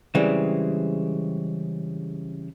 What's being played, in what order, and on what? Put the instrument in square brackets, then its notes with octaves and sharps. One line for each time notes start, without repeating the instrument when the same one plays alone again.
[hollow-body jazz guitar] C#3 E3 G3 G#3 C4